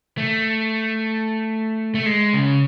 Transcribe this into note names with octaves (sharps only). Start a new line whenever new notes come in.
A3
A3
G#3
C#3